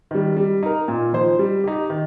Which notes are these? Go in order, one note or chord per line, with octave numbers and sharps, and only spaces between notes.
D#3 G3
G3
D#4 A#4
A#2
F3 D#4 C5
G3
D#4 G4
D#3